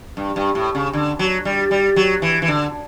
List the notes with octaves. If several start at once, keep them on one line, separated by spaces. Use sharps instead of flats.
G2
G2
A2
C#3
D3
F#3
G3
G3
F#3
E3
E3
D3